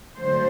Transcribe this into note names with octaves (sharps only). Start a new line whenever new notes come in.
D3 F#3 A3 C5